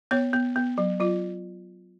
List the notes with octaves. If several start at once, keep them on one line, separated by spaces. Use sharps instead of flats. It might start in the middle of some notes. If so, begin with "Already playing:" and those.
B3 C#5
B3
B3
F#3
F#3 F4